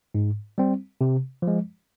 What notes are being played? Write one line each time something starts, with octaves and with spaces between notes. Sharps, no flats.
G#2
G3 C4
C3
F3
G#3